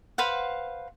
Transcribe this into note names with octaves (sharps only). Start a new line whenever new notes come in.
B4 C5 F5 F#5